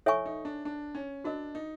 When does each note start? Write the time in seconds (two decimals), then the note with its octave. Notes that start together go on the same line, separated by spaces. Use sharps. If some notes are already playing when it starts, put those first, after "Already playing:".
0.06 E4 A4 C#5 E5 G#5 C#6
0.26 D#4
0.45 D4
0.65 D4
0.95 C#4
1.24 D4 F#4 A#4 D#5
1.55 D#4